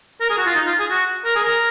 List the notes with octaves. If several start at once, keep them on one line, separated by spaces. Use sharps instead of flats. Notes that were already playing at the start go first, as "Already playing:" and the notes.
A#4
G#4
F#4
F4
D#4
F4
G#4
F#4
A#4
G#4
A#4